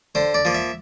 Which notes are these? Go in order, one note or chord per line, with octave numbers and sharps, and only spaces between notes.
D3 C5
D5
F3 A#3
E5